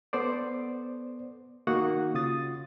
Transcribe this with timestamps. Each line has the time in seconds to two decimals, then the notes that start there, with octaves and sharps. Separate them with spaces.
0.13 B3 A4 C5 D5
1.67 D#3 A#3 D#4 F#4 F#5 C#6
2.14 C#3 F4 D#6 A6